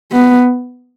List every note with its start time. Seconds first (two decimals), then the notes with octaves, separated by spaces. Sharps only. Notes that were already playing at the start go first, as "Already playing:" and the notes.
0.12 B3